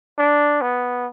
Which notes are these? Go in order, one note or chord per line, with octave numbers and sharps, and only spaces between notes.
D4
B3